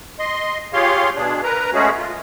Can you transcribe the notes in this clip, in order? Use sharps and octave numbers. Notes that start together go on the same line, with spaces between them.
D#5 C6
F4 G4 G#4 C#5 F5 C6
B2 D4 G#4
A#4 B4 A#5
G#3 A3 C#4 F#4 G#4
F4